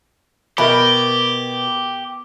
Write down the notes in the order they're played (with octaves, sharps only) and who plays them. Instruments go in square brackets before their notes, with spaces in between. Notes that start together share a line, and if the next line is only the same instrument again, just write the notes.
[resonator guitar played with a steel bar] B2 [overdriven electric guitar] G4 [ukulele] A#4 E5 B5